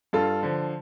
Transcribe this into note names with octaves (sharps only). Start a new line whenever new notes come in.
G2 F4 A4
D3 F3